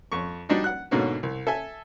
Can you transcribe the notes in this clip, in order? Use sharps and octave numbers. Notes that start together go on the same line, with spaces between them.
F2 C#6
G3 D4 D#4 F#4
F#5 F#6
G#2 B2 D3 A#3 C#4 F#4
C2
A4 E5 G#5